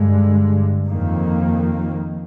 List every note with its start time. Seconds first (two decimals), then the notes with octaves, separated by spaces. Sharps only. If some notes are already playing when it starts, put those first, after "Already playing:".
Already playing: G2 D3 G#3
0.86 F2 D#3 A#3